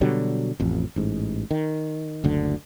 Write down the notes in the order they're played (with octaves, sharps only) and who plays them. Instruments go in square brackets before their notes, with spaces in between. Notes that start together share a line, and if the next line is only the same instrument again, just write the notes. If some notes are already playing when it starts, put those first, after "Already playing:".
[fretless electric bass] B2 D3 F#3 G3
A1 F2
A1 G#2
D#3
F#1 D2 D3